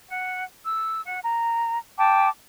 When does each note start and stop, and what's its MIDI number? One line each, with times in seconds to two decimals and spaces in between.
0.11 0.44 78
0.65 1.02 88
1.05 1.20 78
1.25 1.78 82
1.98 2.29 79
1.98 2.29 81
1.98 2.29 86